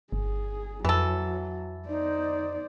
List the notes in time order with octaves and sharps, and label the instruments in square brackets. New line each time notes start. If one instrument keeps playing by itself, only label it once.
[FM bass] G1 [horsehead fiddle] G#4
[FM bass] F2 [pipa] E3 A4 [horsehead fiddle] F#3
[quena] D#4 [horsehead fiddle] C5 D5